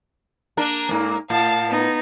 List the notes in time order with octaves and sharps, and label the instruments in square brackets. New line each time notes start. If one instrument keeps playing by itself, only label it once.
[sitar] A#3 D4 A#4
G#2 A#3
[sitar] A2 [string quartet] F5 A5
[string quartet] B3 D#4